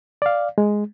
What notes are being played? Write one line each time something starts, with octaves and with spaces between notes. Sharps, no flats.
D5 F5
G#3